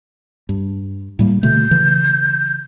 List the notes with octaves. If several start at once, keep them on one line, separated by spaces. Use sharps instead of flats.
G2
A2 G3 A#3
B2 D3 A3 G6
C#3 E3